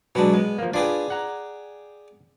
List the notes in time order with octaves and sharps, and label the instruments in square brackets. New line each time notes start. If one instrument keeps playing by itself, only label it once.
[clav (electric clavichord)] B2 B4 [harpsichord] F#3 G#3 D4
[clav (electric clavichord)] G#3 [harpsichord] B3
[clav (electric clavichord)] F3 A#3
[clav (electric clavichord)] D4 F4 B4 [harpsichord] G4 G#4 D5
[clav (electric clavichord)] F#5 A#5